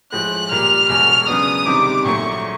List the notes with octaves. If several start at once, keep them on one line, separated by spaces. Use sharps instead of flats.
A2 F3 G#3 F#6
A#2 G3 A#3 F6
E1 E2 B2 F6
C#3 F#3 B3 D4 D#6
C#2 C3 D#3 G3 C4 D6
A#1 A#2 F#3 A3 C#6